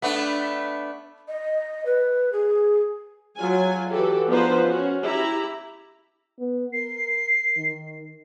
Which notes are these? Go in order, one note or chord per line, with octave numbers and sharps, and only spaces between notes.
A3 B3 D4
D#5
B4
G#4
F#3 F4 G#5
E3 F#4 G4 A4
F3 B3 D4 D#4 B4 C5
C#4 F#4
E4 G4 A#5
B3
A#4 C7
D#3